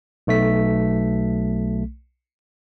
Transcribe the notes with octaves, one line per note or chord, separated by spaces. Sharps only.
B1 A3 B6